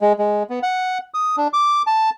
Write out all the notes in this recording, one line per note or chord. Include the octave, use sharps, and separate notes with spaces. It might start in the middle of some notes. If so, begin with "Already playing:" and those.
G#3
G#3
B3
F#5
D#6
D4
D6
A5